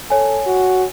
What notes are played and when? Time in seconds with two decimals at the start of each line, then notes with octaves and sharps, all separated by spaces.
0.10 A4 C#5 G#5
0.46 F#4